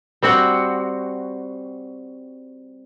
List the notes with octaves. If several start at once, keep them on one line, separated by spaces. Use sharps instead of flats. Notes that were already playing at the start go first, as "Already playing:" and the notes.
G3 C4 F#4